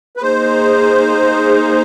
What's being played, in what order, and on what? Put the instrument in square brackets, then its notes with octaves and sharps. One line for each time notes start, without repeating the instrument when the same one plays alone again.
[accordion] B4
[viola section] A#3 D#4 G#4 [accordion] C5